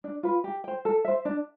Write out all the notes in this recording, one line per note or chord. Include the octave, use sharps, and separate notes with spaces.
D4
F4 B4
G4
C5 G5
A4
C5 E5
D4